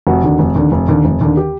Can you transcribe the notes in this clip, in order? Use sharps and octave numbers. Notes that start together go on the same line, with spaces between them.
F1 F#4
D#2 D3
F1
D#2 D3
F1
D#2 D3
F1
D#2 D3
G4